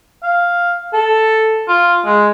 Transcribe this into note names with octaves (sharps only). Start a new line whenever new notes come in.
F5
A4
F4
G#3